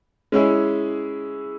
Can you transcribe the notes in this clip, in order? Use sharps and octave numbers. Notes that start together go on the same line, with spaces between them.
G#3 C#4 E4 G#4